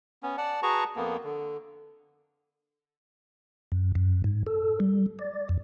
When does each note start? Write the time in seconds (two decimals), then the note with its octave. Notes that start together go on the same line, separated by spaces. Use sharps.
0.23 B3 C#4
0.38 D5 F#5 A5
0.63 F#4 G#4 B4 A5 A#5 C#6
0.96 F2 A#3 B3
1.23 D3
3.72 F#2
3.95 F#2
4.24 G#2
4.47 A4
4.80 G3
5.19 D5
5.49 F2